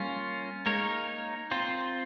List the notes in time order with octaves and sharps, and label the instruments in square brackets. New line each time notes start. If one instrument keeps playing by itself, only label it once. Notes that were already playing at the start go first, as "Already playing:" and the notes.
Already playing: [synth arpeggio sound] G3 [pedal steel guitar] A#3 C#4 F4
[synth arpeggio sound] G#3 [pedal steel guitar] A#3 D#4 A#4 C#5
[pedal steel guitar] C4 F4 C5